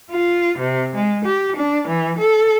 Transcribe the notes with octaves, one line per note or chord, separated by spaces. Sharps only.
F4
C3
G#3
G4
D4
E3
A4